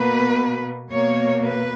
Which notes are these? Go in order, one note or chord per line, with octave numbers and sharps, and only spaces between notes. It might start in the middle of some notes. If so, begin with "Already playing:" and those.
Already playing: B2 A#3 B4
B2 A#3 C#5
B4